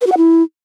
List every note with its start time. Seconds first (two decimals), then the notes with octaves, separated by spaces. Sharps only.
0.01 B4
0.07 F#4
0.12 F#5
0.17 E4